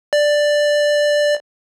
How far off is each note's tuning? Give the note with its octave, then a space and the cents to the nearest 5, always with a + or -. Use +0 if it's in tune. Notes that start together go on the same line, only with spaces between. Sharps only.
D5 +5